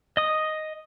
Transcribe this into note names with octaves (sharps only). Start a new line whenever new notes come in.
D#5 D#6